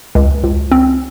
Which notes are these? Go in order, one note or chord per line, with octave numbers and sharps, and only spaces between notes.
C#2
C#2
C4